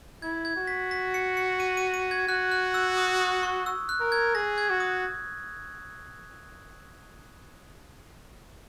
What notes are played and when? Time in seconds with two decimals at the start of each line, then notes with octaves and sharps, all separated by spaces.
0.22 E4 G#6
0.45 G#6
0.56 F#4
0.67 B6
0.91 B6
1.14 C#7
1.37 C#7
1.60 D#7
1.77 D#7
1.94 D#7
2.11 G#6
2.28 F#4 F#6
2.52 F#6
2.74 E6
2.97 D#6
3.20 D#6
3.43 C#6
3.66 E6
3.89 F#6
4.00 A#4
4.12 G#6
4.35 G#4 A#6
4.58 G#6
4.70 F#4
4.80 D#6